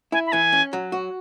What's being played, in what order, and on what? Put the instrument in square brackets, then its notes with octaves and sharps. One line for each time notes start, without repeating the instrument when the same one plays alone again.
[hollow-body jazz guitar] E4 [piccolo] G#5
[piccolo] B5
[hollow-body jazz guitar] E3 [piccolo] G#5
[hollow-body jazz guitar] C#4
F#3
F#4